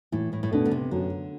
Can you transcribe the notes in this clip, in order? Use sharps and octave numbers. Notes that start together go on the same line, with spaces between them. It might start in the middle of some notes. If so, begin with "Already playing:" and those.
A2 E3
A2
A2
B2 A3 D4
D3
C3
F#2 D3